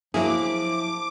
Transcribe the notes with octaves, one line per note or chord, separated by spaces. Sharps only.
F3 F#3 A#3 E4 G#4 D6